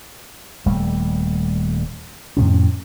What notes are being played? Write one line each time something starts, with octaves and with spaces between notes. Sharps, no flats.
D#1 G3 A3
F2 A2 C3 C#4